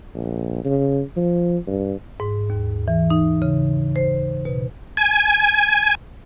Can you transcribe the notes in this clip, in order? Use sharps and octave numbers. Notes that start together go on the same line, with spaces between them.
A#1
C#3
F3
G2
G#2
D#2
E3
D#4
C#3
C5
B2
G#5